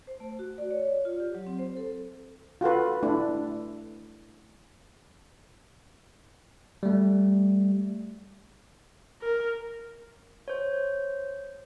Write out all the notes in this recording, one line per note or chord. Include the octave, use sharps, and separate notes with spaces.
C5
A3
F#4
D5
C#5
D5
F4
G4
F#3
C4
C5
A4
F4 F#4 A4 B4
A3 D4 E4
G3 A3
A#4
C5 C#5